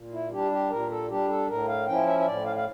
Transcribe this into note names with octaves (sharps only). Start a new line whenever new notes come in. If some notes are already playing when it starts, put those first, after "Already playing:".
Already playing: A#2
E4
G3 D4 G4
G4
A#2 A#4
A4
G3 D4 G4
A4
A2 A#4
F5
F3 C#4 E4 G5
E5
E5
A2 D5
F5
F5